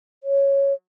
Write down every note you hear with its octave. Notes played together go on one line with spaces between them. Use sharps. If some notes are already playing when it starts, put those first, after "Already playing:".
C#5